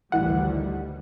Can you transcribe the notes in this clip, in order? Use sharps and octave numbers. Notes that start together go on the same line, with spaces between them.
A1 D2 D#3 E3 G3 F#5